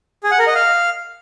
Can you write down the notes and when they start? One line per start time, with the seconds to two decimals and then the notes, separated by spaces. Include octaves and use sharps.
0.23 G#4
0.31 F#5
0.39 A#4
0.47 D#5
0.55 F5